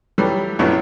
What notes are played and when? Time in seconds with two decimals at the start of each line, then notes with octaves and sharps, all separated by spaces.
0.18 E3 F#3 G3 A3
0.59 A#1 F#2 A2 F#3 B3